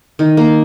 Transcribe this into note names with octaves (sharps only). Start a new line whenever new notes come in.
D#3
A#3